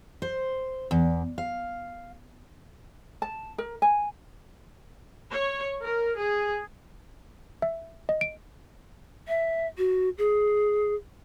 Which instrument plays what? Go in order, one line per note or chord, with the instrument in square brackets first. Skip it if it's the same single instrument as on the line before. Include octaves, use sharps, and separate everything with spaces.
[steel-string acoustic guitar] C5
E2
F5
[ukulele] A5
A#4
G#5
[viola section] C#5
A#4
G#4
[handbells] E5
D#5
D7
[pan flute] E5
F#4
G#4